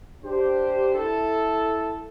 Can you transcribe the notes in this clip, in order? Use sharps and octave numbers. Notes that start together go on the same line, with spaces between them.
D4 G4 C5
E4 A4